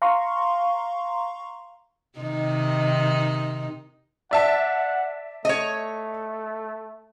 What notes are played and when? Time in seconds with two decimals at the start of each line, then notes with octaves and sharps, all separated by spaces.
0.02 F5 A#5 C6 C#6
2.19 C3 D#3 D#4
4.31 D5 E5 F#5 A5
5.45 A3 C#5 D#5